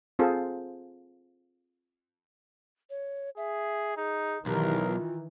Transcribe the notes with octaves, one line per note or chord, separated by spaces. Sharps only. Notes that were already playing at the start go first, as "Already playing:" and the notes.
C4 F4 G#4 A4 C5
C#5
G#4 E5
D#4 G#4
B1 D#3 E3 G4 A#4
F4